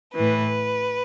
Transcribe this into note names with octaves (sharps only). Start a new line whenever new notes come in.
A2 E3 B4